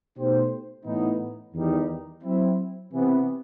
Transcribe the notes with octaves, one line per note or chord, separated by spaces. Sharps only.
B2 A3 D#4 G4 C5
A2 E3 B3 D#4
E2 D#3 G3 D#4
F#3 C4 E4
C3 E3 B3